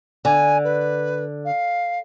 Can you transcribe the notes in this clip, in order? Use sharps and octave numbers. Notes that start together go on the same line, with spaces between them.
D3 G#5
B4
F5